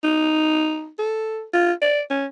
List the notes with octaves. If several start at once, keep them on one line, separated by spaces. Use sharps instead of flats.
D#4
A4
F4
D5
C#4